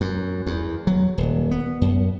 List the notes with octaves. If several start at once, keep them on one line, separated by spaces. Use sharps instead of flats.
F#2
E2
F#3
D#1
B3
F#2